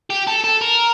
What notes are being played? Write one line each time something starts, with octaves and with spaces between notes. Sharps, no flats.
G4
A4
A4
A#4